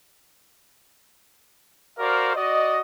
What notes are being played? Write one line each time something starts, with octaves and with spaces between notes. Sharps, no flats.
F#4 A#4 C5 D5 F5
F#4 D5 D#5